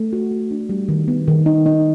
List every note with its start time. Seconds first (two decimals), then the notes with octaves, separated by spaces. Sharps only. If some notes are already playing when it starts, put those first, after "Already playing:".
Already playing: A3
0.13 F#4
0.31 F#4
0.51 D4
0.69 G3
0.89 D#3
1.08 B3
1.28 D#3
1.46 D#4
1.66 D#4